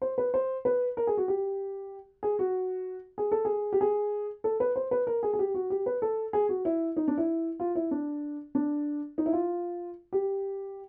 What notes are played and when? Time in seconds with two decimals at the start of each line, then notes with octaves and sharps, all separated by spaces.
0.02 C5
0.18 B4
0.34 C5
0.65 B4
0.97 A#4
1.07 G#4
1.17 F#4
1.28 G4
2.23 G#4
2.39 F#4
3.18 G#4
3.32 A4
3.45 G#4
3.73 G4
3.81 G#4
4.44 A4
4.60 B4
4.76 C5
4.91 B4
5.07 A#4
5.23 G#4
5.34 G#4
5.39 G4
5.54 F#4
5.70 G4
5.86 B4
6.02 A4
6.33 G#4
6.49 F#4
6.65 E4
6.97 D#4
7.08 D4
7.18 E4
7.60 F4
7.75 E4
7.91 D4
8.55 D4
9.18 D#4
9.26 E4
9.33 F4
10.13 G4